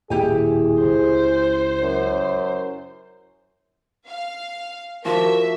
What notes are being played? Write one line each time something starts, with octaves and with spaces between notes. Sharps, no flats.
D#1 A2 E4 G4 G#4 G#5
C#2 C5
F#2
F5
F3 F#4 A#4 E5 D6